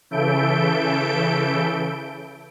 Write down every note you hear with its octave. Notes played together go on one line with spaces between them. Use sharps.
C#3 E3 A4 E5 G6 D7